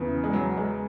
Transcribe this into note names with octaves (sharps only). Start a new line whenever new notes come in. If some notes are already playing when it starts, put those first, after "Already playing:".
Already playing: E2 C#3 E3
G#3
F#3
G#3